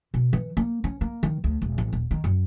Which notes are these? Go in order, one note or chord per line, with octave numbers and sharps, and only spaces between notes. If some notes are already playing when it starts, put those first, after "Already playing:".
B2
E3
A#3
C#4
A#3
D#3
D2
E1
A1
D#1
D#3
F#2